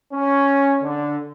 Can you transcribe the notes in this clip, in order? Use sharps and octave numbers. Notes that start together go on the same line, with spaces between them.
C#4
D3